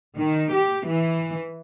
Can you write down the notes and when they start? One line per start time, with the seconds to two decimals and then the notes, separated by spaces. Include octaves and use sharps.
0.17 D#3
0.53 G4
0.87 E3